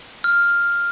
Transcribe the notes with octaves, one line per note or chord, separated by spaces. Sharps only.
F6